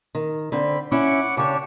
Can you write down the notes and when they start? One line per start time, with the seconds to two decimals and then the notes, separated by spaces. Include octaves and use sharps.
0.15 D#3
0.52 D3 C4 B5
0.92 C#4 E4 F#5 C#6 D6
1.37 C#3 D4 G4 C#5